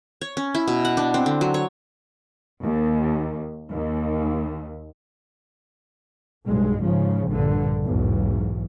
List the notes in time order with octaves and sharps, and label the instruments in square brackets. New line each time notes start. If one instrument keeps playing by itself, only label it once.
[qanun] C#5
C#4
E4
B2
F#5
D4
C4
D3
F#3
C#5
[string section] D#2
D#2
[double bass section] B1 G2 G#3
G#2 C#3 F3
A#1 G2 D3
B1 E2 G#2